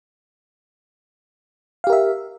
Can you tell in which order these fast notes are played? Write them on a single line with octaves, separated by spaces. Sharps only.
F5 G4 A#4 E5